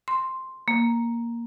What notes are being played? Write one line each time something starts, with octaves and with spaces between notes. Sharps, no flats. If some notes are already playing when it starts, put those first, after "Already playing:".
C6
A#3